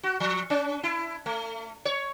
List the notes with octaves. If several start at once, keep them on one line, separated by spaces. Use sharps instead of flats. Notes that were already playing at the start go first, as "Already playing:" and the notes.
F#4
F3
C#4
E4
A3
C#5